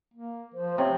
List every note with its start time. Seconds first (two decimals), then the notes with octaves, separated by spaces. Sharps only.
0.14 A#3
0.54 F3 C5
0.78 C3 C#5